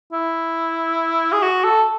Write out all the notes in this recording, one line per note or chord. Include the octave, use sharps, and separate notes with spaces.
E4
G#4
F#4
A4